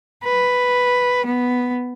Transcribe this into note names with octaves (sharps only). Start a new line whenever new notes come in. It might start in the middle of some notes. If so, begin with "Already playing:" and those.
B4
B3